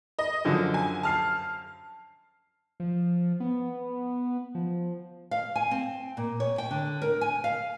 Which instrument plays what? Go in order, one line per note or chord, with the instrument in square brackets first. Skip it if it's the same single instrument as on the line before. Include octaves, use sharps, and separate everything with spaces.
[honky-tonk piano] D#5
[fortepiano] F#2 D3 F3
[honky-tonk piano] G#5
A5 F6 C7
[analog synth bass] F3
B3
F3
[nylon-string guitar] F5
G#5
C4
A#2
C#5
G5
D3
A#4
G#5
F5